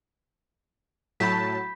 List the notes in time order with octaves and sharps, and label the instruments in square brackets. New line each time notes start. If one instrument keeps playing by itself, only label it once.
[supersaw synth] A2 F#3 A5 [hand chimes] B5 G6 B6